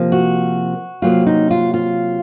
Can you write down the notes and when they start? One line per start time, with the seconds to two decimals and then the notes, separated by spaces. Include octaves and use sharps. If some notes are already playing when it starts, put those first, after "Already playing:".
Already playing: C3 F3 A#3
0.12 F#4
1.02 C3 F#3 A#3 F4
1.26 D#4
1.51 F4
1.74 F4